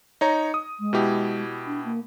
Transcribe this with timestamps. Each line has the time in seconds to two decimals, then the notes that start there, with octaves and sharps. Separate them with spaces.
0.21 D#4 C#5 A#5
0.54 D#6
0.80 G#3
0.93 B2 E4 G4
1.66 D4
1.85 A#3